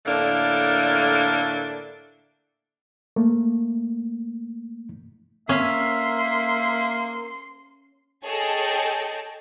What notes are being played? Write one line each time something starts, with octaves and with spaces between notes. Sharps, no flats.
A2 D3 A3 A#3 D4
A3 A#3
A#3 C#4 E5 C6
G#4 A4 C#5 D#5 G5 A5